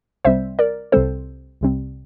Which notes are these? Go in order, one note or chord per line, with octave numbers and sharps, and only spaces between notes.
C2 C3 G3 C4 C5 E5
A#4 D5
C2 C3 G3 C4 A4 C5
C2 C3 G3 C4